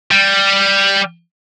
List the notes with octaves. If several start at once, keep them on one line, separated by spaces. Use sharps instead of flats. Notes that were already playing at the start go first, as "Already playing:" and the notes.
G3